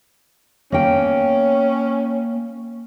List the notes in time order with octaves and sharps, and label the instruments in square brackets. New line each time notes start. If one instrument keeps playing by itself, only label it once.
[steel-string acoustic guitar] A#3 G5 [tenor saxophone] C#4